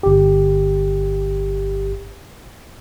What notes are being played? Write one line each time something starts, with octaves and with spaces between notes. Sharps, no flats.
G1 G4